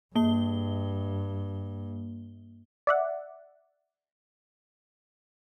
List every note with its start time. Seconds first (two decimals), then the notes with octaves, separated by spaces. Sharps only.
0.15 G2 A#3 G7
2.87 D5 E5 F#5